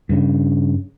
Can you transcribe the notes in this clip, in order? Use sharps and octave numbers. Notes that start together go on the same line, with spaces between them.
G2 C#3